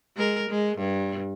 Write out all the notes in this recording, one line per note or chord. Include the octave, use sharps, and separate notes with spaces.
G#3 A#4
G#3
G2